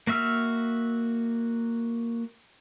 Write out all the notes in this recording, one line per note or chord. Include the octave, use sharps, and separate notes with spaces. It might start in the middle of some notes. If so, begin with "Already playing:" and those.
A#3 F#4 E5 E6 F6